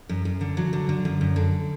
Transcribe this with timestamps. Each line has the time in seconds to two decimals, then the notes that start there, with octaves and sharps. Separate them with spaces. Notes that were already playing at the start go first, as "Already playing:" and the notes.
0.09 F#2
0.25 F#2
0.41 D3
0.57 F#3
0.73 D3
0.89 D3
1.05 F#2
1.21 F#2
1.36 D3